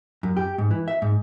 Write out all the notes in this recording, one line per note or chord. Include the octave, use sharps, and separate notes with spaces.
F#2
G4
G#2
E3
E5
G#2